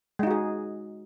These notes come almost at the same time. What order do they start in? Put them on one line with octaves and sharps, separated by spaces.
G#3 D#4 F#4 G#4